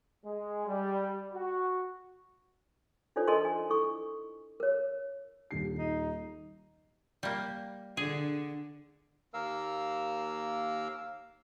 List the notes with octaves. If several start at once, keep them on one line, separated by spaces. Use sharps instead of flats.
G#3
G3
F#4
D4 D#4 F4 A4 C5 D5
A4 A#4 D#5 G#5 A5 C6
G#5
E4 A4 C#6
A#4 C#5
D#1 D#3 C7
D#4
G3 A#3
D3 G#4
D#2 A#3 A#4 F5 E6